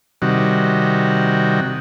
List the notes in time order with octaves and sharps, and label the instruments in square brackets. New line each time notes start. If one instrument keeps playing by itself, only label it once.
[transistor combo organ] C3 D#3 G3 F#4